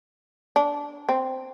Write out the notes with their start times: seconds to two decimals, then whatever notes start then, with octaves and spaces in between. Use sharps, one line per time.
0.56 D4
1.09 C4